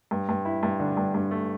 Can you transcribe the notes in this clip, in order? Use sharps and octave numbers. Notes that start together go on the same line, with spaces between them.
G2
G2
E4
G2
D3
G2
G2
A3